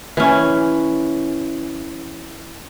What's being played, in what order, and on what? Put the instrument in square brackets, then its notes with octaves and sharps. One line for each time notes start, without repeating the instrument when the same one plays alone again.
[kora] E3 C#4